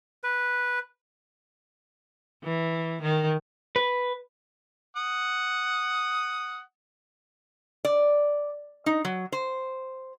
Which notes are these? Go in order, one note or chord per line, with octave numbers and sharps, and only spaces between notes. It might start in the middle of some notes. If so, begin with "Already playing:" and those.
B4
E3
D#3
B4
F#5 D#6
D5
D#4
F#3
C5